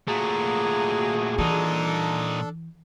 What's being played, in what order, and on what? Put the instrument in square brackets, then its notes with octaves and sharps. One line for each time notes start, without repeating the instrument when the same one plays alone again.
[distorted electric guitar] A#2 A3 [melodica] A#3 A#5 [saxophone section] F#4 G#4
[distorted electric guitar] A#2 D#4 [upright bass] E3 [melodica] D4 A4